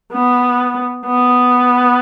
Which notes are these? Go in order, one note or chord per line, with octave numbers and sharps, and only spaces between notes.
B3
B3